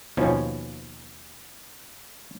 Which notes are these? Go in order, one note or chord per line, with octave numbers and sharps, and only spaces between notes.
D#2 B2 F3 C#4